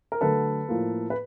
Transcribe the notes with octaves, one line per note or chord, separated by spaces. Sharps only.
A#4
D3 F#3 A3 A4 B4
A2 F3 A#3
B4